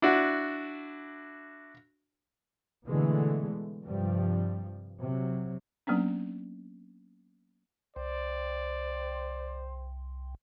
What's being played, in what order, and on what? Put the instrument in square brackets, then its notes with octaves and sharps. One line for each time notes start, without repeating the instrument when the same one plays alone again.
[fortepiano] D4 E4 F#4
[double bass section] B2 D3 E3 G#3 A3 B3
G2 C3 F3 G3
C3 F#3
[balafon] F#3 A#3 B3 C#4 D4
[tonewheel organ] C2 [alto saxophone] C5 [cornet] D5